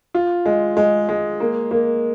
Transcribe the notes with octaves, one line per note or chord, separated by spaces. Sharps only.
F4
G#3
G#3
G#3
A#3
A#3